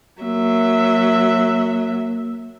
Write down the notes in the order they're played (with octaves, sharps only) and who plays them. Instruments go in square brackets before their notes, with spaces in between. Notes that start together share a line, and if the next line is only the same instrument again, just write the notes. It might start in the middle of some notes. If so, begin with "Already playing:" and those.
[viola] F#3 E5 [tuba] A#3